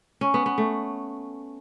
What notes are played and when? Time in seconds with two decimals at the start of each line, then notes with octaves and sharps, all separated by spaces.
0.21 C#4
0.34 B3
0.46 B3
0.58 A3